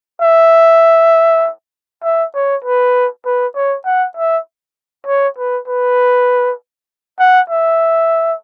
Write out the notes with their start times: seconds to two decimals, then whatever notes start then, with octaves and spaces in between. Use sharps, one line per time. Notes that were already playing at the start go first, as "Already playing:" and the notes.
0.22 E5
2.04 E5
2.35 C#5
2.65 B4
3.26 B4
3.56 C#5
3.85 F#5
4.17 E5
5.07 C#5
5.38 B4
5.68 B4
7.19 F#5
7.50 E5